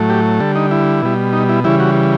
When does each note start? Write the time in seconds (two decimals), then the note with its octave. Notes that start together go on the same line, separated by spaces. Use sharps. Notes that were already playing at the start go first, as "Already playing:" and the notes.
Already playing: A2 F#3 A3
0.10 G4
0.40 D3 G3 A4
0.55 D#4
0.71 E4
1.03 B2 G3
1.33 D#4
1.49 E4
1.64 C#3 E3 G3 E4
1.80 F#4